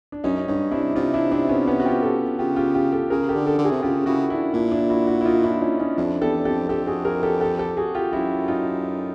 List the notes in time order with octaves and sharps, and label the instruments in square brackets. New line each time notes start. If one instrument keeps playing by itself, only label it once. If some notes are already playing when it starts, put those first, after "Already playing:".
[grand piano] D4
[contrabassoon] F#2 [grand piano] C#4 D#4
[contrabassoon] G2 [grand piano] C#4 D#4
[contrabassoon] C3 [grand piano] D4 E4
[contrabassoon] C3 [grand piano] D#4 F4
[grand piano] D4 E4
C4 D4
B3 C#4
B3 C#4
F#4
F4 G4
G4 A4
[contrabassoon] C#3 [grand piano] F4 G4
[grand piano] F4 G4
F4 G4
G4 A4
[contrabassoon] C#3 [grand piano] G#4 A#4
[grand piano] G4 A4
[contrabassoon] D3
[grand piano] G4 A4
[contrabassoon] D3
[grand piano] F#4 G#4
[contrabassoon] C3
[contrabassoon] C#3 [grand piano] F4 G4
[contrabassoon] C#3 [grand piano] E4 F#4
[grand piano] D4 E4
[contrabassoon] A#2 [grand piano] D4 E4
[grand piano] D4 E4
E4 F#4
E4 F#4
E4
D#4 F4
D4 E4
C#4 D#4
C#4 D#4
[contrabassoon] F2 [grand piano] D4 E4
[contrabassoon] E2 [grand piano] G4 A4
[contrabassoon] F2 [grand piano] G4 A4
[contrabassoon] F2 [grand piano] G4 A4
[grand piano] F#4 G#4
G#4 A#4
G4 A4
G4 A4
G4 A4
F#4 G#4
F4 G4
[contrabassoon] F#2 [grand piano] E4 F#4
[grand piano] D#4 F4